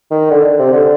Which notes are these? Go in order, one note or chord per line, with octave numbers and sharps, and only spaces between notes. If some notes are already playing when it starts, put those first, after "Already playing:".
D#3
D3
C3
D3